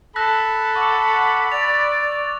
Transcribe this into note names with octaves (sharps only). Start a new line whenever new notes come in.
A4 B5 E6 F#6 A#6
F#5 C#6 D6 E6
D5 A6 F7